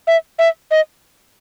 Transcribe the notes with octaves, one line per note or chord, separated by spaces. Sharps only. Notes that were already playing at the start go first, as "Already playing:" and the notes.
E5
E5
D#5